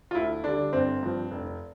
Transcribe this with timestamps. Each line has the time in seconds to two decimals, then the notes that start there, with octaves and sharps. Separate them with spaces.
0.11 F4
0.15 D2 E4
0.44 D3 G3 D4
0.73 G1 C4
1.03 G2 F3
1.31 F1